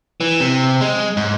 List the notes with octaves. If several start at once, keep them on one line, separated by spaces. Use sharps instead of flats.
E3
C3
G#3
G#2